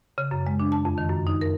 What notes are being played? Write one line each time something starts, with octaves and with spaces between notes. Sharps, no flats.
C#3
F#2
G#3
D4
A5
F2
D#3
F#2
D#4
A#4